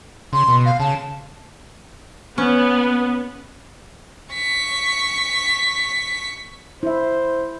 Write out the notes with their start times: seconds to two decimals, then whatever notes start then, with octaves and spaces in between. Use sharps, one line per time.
0.33 C#3 C6
0.48 B2
0.66 F5
0.80 C#3 A5
2.38 B3 C#4
4.34 C#6 B6
6.83 E4 C5 E5